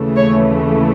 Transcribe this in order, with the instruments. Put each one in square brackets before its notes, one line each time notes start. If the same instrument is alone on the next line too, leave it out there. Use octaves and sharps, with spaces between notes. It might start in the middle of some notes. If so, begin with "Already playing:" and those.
Already playing: [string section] D#2 C#3 E3 A3
C#5